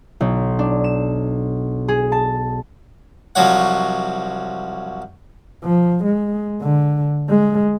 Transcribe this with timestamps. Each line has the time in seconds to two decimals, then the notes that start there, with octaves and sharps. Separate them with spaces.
0.21 B1
0.59 D4
0.84 E7
1.88 G#4
2.12 A5
3.35 C2 F3 F#3 C#5 F#5
5.64 F3
6.05 G#3
6.62 D3
7.30 G#3